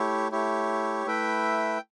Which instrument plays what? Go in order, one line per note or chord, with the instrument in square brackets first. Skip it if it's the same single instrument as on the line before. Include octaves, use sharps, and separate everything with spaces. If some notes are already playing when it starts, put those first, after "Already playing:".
Already playing: [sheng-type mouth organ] A3 E4 G4 C#5
A3 E4 G4 C#5
A3 E4 B4 E5 G5